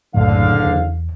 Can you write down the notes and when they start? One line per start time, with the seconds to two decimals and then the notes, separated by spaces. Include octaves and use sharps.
0.14 F#1 C2 F#2 A2 D3 F5
0.66 E2